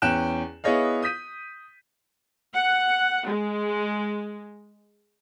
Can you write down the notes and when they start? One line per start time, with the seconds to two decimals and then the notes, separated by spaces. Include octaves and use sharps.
0.02 E2 C#4 G5 F#6 E7
0.64 B3 E4 G#4 C#5 D#5 F5
1.02 D#6 G6 B6 D#7
2.54 F#5
3.26 G#3